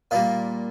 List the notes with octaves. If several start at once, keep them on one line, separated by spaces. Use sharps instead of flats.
A#2 G3 A#3 F5